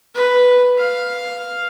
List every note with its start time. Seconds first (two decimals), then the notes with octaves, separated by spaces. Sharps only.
0.15 B4
0.78 F5